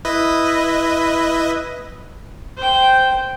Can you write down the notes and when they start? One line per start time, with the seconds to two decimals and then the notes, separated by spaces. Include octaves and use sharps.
0.05 E4 B4 D#5
2.57 C5 G5